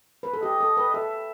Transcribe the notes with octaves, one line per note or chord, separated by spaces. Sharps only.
B4
A4
G4 D#5
A4
B4
A4 E5